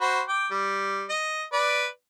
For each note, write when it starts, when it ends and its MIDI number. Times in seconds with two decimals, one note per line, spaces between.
0.01 0.22 66
0.01 0.22 72
0.01 0.22 83
0.28 0.50 79
0.28 0.50 86
0.51 1.06 55
1.09 1.44 75
1.52 1.87 71
1.52 1.87 74